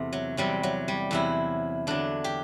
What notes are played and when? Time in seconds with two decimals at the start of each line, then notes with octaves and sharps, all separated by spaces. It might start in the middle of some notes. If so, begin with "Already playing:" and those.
Already playing: E2 C3 A3
0.13 F#3
0.37 E2 C3 F#3 G3
0.63 F#3
0.88 G3
1.11 E2 C3 F#3 E4
1.87 E2 D3 F#3 D4
2.24 G4